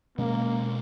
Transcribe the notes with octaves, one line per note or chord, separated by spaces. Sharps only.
B2 G#3 A#3 C#4